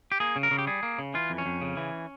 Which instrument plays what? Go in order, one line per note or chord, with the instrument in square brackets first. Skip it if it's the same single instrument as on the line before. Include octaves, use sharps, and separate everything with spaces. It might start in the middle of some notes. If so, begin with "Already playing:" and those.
[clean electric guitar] G4
A#3 G#4
C#3
A#4
C#3
G4
G3 G#4
A#3
C#3
E3 F4
F2
C#4
F2
C#3
E3